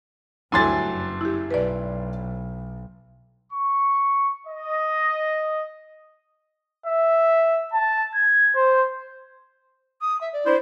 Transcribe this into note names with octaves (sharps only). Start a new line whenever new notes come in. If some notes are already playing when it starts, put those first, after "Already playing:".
D2 G2 F#3 A3 E4 G#5 C6 A6
F#1
E4 G4
B1 B4 D5
C#6
D#5
E5
A5
G#6
C5
D#6
E5
D5
D4 E4 C5